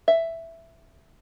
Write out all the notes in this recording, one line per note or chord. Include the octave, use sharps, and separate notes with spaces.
E5